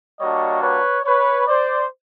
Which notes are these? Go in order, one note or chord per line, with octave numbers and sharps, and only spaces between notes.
G3 A#3 D4 F#4 C#5 D#5
B4 C#5
B4 C#5
C5 D5